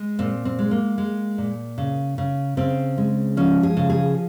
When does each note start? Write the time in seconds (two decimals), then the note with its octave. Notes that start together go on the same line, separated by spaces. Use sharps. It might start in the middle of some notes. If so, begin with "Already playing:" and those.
Already playing: G#3
0.19 A#2 C4
0.45 C4
0.59 G#3
0.71 A#3
0.98 G#3
1.38 A#2
1.78 C#3
2.18 C#3
2.57 C#3 C4
2.98 G#3
3.37 F3 C#4
3.63 G#4
3.77 C#3
3.90 G#4